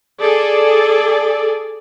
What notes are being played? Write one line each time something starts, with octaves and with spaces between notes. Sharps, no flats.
G#4 A4 D5